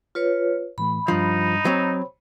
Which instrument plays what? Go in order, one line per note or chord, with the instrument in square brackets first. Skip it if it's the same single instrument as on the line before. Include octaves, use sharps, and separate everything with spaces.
[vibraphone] F4 B4 C#5
[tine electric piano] A2 E3 A3 [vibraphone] B5
[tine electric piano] G2 G3 D4 [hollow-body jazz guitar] F3 [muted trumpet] D#4
[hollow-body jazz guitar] F#3 C4 [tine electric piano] C5 C#5